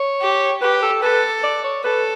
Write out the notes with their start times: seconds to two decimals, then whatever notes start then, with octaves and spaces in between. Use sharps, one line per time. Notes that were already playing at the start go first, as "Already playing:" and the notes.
Already playing: C#5
0.22 G4
0.62 G4 B4
0.82 A4
1.02 A4 B4
1.44 D5
1.64 C#5
1.84 A4 B4